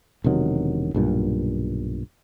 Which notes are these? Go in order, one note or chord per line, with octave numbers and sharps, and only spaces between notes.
E1 C3 D#3 F#3
B1 G2 A#2